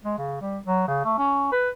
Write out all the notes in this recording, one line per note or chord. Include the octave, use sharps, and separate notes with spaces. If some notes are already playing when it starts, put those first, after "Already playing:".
G#3
C#3
G3
F#3
C#3
A3
C#4
B4